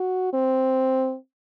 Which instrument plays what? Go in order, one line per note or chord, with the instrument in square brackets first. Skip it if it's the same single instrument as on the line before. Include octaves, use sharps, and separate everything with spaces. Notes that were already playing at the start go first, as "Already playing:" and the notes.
Already playing: [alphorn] F#4
C4